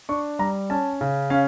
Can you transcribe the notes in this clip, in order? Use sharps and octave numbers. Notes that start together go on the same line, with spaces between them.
D4 C#6
G3 A#5
C#4 A5
C#3
C#4 F5